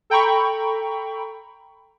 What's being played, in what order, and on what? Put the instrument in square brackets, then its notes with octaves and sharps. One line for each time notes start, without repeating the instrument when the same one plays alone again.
[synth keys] A4 G5 A#5 B5 C#6